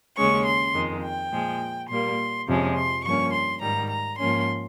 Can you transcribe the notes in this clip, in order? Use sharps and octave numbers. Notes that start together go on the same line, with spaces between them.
D#2 C#3 G#3 C#4 C#6
C6
F2 D#3 G#3
G5
A#2 F3 G#3
A#2 G3 A#3 C6
F2 C3 F3 G#3 C#4
C6
G2 F3 A#3 C#4 C#6
C6
G#2 D#3 G3 A#5
A#5
G#2 F3 A#3 C#4 C6